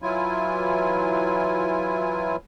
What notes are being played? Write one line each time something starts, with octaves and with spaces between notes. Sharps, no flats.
E3 F#3 E4 F4 G#5